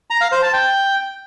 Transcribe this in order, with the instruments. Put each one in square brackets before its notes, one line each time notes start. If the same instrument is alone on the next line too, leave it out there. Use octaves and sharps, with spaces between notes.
[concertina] A#5
F5
C5
A5
G5